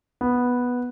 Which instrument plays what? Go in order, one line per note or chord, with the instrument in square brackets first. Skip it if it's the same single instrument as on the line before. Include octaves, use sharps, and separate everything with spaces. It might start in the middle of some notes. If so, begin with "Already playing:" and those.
[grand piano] B3